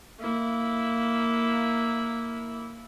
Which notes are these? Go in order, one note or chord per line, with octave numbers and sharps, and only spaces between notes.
A#3 E4